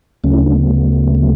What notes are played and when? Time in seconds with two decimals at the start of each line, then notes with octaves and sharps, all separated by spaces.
0.24 D2 C#3 F#3 A3 C#4
0.34 E4
0.39 D4
0.54 B3
1.15 B3